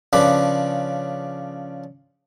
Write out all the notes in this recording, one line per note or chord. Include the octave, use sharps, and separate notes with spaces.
C#3 F3 D4 B4